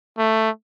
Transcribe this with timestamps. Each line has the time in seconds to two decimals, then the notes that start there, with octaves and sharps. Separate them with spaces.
0.18 A3